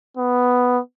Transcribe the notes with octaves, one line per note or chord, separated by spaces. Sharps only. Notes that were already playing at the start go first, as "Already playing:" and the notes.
B3